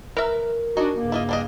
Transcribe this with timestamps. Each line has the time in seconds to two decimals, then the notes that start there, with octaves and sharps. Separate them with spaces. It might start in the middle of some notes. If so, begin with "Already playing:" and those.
0.17 A#4 B4 E5
0.77 D4 D#4 F#4 G#5
0.96 G2 C#3 A#3
1.12 E4 F4 D#5
1.29 G3 D4 D#5